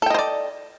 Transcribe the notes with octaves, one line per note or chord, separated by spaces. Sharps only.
A4 C5 D5 D#5 G5